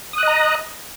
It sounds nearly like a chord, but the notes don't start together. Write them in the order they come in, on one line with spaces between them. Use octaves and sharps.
D#6 F#6 D#5 A#5